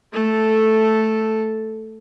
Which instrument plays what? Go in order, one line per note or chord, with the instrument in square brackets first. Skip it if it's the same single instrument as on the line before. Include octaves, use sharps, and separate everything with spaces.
[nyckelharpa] A3 A4